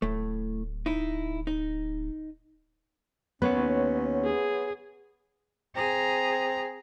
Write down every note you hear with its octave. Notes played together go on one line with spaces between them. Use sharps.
D1 A2 A3
D#4 E4
D#4
D#2 B3 C#4 B4 C#5 F#5
G#4
C4 G#4 A#5